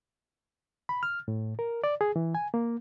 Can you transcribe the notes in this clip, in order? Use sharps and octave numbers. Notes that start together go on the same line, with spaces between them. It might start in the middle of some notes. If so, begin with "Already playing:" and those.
B5
F6
A2
A#4
D5
G#4
E3
G#5
A#3